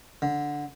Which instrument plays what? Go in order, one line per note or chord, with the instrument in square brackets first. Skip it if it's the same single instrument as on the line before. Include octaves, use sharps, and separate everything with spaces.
[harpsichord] D3